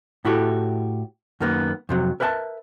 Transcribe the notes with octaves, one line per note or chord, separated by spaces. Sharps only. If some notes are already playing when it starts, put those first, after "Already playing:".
A2 E4 F#4 G4 A4
F#2 D#3 A#3 B3
F2 C3 F#3
A#4 B4 E5 G5 A5